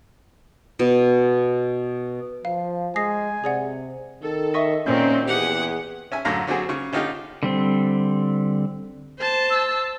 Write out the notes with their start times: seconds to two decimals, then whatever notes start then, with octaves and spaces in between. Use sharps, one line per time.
0.79 B2
2.45 F3 F5
2.96 G#3 G#5 D#6 A#6 C7
3.44 C3 G#4 D5 F#5
4.23 D#3 A4
4.54 D#5 E5 C#6
4.86 A#2 D#3 C4 C#4 G6
5.28 E2 G4 G#4 F#5
6.12 C#4 E5 G#5
6.25 F#2 A2 D3 F#3 F5 A#5
6.47 D3 F#3 C4 F#4 G#4
6.69 C#3 C#6
6.93 D3 C#4 D#4 F4 G4
7.43 D3 G3 C4
9.19 C5 A5
9.50 E6